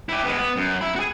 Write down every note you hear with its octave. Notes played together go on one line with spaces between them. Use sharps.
E4 G4
G#3 B3
B3
F#2
E5 B5
F#4 G#4